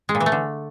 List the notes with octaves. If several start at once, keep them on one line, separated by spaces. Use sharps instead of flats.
G#3
A#2
E3
A3
D3